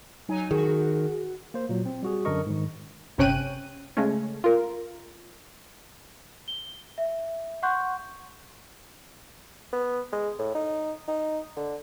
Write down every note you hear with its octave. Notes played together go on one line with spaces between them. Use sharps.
F#3 D#4 G#5
D#3 F#4 G#4
A#3 C5
A#2 F#3
C4
G3 F#4 G#4
F#2 D3 D4 A#4 D#5 C#6
G#2 D#3
G1 C3 C#4 G5 F#6 D#7
C#3 G#3 A3 C#4
F4 A#4
G7
E5
F#5 C6 C#6 F#6 G6
B3
G#3
A2
D#4
D#4
D3